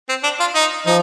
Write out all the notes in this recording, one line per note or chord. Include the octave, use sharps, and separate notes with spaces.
C4
D4
F4
D#4
F3 D#4